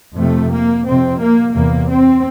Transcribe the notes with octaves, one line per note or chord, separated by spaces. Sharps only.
F2 C3 A3
A#3
F2 C3 C4
A#3
E2 C3 A#3
C4